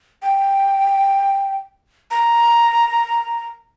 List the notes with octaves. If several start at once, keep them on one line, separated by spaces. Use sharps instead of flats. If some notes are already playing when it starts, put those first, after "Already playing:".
G5
A#5